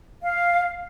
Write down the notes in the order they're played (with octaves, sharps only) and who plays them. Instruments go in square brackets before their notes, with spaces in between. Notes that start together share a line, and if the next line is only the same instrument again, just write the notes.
[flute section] F5